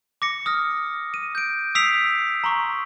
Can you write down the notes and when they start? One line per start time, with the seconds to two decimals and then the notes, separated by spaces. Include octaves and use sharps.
0.22 D6 A#6 C#7
0.46 D#6 F6 A#6
1.14 D#7
1.35 G6 D7
1.75 D#6 E6 B6 C7 D7 F7
2.44 A#5 C6 C#6